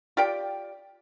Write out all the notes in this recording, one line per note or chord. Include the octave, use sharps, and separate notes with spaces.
F4 G4 D5 G5